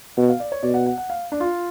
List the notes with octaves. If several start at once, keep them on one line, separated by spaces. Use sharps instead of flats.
B2 F#5
F5
D5
C#5
B2 D5
F#5
F#5
F#5
F5
D4
F4